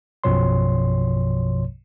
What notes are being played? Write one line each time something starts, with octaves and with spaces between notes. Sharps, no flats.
A#1 F#2 B2 F3 C#5 C6